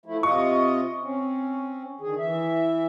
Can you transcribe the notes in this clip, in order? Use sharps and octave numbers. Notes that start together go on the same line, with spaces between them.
F3 A3 E4
C3 F4 D#5 C#6
C4 C#4
D3 D#3 G#4
E3 E5